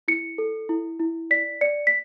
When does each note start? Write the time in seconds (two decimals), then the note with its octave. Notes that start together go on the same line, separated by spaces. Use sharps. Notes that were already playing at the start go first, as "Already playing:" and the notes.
0.08 E4 C#7
0.38 A4
0.69 E4
1.00 E4
1.31 D5 B6
1.61 D5 C#7
1.87 B6